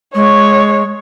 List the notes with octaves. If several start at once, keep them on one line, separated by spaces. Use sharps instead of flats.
G#3 C#5